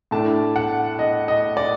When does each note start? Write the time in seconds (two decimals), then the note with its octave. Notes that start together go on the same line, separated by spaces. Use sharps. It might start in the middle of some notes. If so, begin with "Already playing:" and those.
0.11 A2 A3 D4 A5
0.56 F#5
0.99 D#5
1.28 D#5
1.57 D5